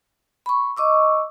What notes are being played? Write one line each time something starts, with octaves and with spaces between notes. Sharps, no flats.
B5 C#6
D#5 C#6 D6 E6